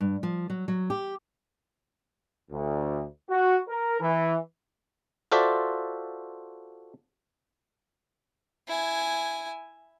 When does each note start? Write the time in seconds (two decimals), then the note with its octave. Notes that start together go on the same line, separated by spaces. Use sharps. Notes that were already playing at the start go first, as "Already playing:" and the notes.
0.01 G2
0.23 F3
0.50 F#3
0.68 F#3
0.90 G4
2.51 D2
3.28 F#4
3.68 A#4
4.01 E3
5.32 F4 F#4 A4 C5 D5 E5
8.67 E4 G#5